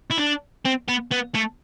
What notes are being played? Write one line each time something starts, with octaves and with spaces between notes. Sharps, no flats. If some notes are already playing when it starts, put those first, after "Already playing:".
E4
D4
C4
B3
B3
A3